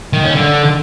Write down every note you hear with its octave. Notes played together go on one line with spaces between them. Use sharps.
D#3
C#4
D3